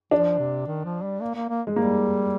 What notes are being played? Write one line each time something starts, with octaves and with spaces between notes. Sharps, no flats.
F3 D4
C3
D#3
F3
G3
A#3
A#3
A#3
G#3
G3 A#3